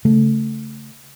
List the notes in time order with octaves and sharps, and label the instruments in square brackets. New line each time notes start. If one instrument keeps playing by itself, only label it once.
[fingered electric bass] C#3 A3